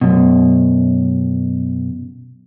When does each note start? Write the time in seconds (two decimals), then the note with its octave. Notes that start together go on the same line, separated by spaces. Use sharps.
0.01 F#2 B2